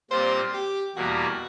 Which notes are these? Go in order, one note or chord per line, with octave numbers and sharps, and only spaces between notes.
A#2 G3 C4 F4 C5
G4
E2 B2 G3 A#3 F#4